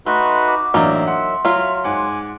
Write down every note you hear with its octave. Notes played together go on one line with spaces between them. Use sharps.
A3 D#4 F#4 B4 C6
D6
A1 F#3 A#3 D4 D#4 D5 E5
F#5 C6
F#3 F4 E5 F6
G#2 F#5 G#5 D6